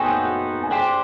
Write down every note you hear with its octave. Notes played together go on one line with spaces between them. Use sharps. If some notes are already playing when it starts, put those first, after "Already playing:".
Already playing: B3 D#4 F#4 A4 C5 G5 G#5
G#5
D4 G4 C5 G5